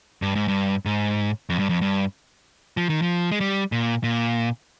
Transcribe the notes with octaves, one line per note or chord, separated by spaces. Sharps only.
G2
G#2
G2
G#2
F2
G2
F2
G2
F3
D#3
F3
G#3
G3
A#2
A#2